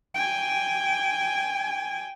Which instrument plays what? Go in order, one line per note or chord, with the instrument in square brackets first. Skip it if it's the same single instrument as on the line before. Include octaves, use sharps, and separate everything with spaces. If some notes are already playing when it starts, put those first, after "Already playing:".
[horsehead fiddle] G5 G#5